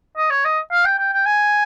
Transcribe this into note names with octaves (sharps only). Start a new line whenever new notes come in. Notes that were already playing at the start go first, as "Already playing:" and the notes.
D#5
C#5
D#5
F5
G5
G5
G5
G#5